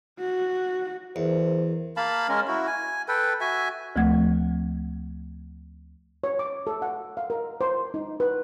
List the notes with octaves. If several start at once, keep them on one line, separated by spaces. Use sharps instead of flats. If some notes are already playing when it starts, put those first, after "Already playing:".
F#4
E2 A#4 C5
A#3 F5 A5 B5
G#3 C#4 A#4
E4 F#4
G#5
A4 B4 G5
F#4 E5 G#5
D2 F3 A3 F#5 G#6
C#5
D6
A4
F#5
F5
A#4
C5
D#4
B4